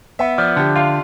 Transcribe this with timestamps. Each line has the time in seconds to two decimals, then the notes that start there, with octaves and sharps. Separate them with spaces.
0.19 B3 E5
0.38 F3 D5
0.56 D3 G4
0.76 F4 F5